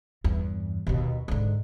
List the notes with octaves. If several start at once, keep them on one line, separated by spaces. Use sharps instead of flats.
E2 G2
D#2 B2
G#2 D3